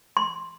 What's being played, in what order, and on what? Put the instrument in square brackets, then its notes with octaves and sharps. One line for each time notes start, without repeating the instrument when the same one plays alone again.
[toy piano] C6